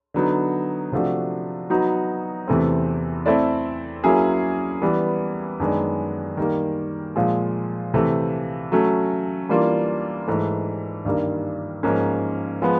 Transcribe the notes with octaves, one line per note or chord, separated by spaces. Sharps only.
D3 F#3 B3 D#4
C3 F3 A3 D4 F#4
F#3 B3 D#4 F#4
E2 C3 E3 A3 C4
A3 C4 E4 A4 D5
F#3 A#3 C#4 E4 G#4
E3 G3 B3
F#2 D#3 G#3 B3 D4
D#3 G3 A#3
A#2 F3 G#3
C3 E3 A3
F#3 A3 C#4
E3 G3 A#3 D4 F4
G#2 E3 A3
G2 D#3 G3 A#3
G#2 F3 A#3 C#4
F3 G#3 B3